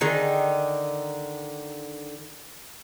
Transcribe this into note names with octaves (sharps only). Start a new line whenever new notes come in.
D3 D#3 G#4